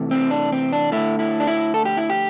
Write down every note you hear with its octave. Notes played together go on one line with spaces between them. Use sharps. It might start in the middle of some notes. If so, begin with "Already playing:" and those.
Already playing: C3 E3 A3
C4
D4
C4
D4
D3 A3 E4
E4
D4
E4
A4
G4
E4
G4